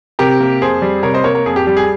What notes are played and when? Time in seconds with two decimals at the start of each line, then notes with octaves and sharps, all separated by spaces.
0.19 C3 G4 A#4
0.40 A#3
0.61 F2 G#4 C5
0.82 G3
1.03 C3 A#4 C#5
1.14 C5 D#5
1.24 A#3 A#4 C#5
1.35 A#4 C#5
1.46 F2 G#4
1.56 G4
1.67 G3 G4
1.77 G#4